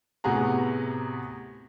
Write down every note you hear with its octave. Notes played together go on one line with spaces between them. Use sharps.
A2 C3 B3 F#4 G#4 A#5